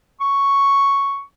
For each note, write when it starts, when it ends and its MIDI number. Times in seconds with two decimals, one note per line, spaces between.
0.21 1.23 85